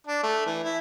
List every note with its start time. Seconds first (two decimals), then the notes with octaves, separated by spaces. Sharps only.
0.07 D4
0.23 A3
0.46 E3
0.64 E4